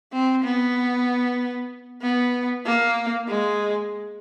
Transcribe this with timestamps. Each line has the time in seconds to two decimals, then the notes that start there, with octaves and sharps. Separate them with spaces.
0.13 C4
0.44 B3
2.02 B3
2.65 A#3
3.28 G#3